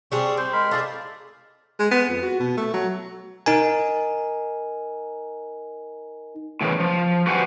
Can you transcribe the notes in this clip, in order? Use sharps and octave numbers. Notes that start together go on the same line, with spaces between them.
G3 C4 D4 G#4 C#6
C4 C5
G#3 A#4 B5
A3 G#4 D5 F5
G#3
B3
F2
F#4
B2
A3
F#3
D#4 A#4 G#5
A2 C#3 E3
F3
F#4 G4 B4 C5 F#5 G#5